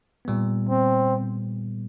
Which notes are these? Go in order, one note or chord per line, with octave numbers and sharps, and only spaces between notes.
A#2 G3 B3
C4